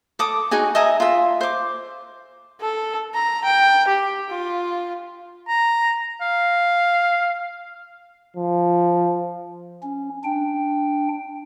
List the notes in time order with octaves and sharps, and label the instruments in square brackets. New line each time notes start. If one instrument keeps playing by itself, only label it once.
[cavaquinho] A4 D6 D#6
D#4 F#4 G#4 G#5
D#5 E5 G#5 A#5
F4 E5
C5 D6
[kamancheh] A4
A#5
G5
G4
F4
[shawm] A#5
F5
[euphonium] F3
[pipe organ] C#4
D4 G5